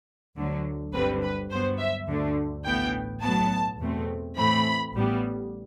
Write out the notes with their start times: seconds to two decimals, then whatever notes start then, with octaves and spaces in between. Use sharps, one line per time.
0.36 D2 D3 F#3
0.93 G1 G2 D3 G3 C4 B4
1.22 B4
1.51 G2 F#3 B3 C5
1.79 E5
2.08 D2 D3 A3
2.65 A1 A2 E3 B3 G5
3.23 B1 A2 F#3 B3 A5
3.80 E2 B2 A3 C4
4.37 A2 E3 A3 C4 B5
4.95 A1 A2 G3 B3